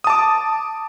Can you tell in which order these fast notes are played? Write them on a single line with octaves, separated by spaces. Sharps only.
D#6 A5 D6